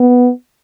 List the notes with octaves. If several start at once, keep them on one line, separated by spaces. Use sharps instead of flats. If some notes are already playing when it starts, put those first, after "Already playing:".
Already playing: B3